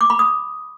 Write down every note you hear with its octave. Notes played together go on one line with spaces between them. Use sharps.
D6
B5
D#6